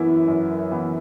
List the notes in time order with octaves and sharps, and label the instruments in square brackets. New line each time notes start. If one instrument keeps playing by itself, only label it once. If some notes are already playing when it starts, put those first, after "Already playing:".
Already playing: [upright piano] F#2 E3 B3 E4
F#2
E3 B3 E4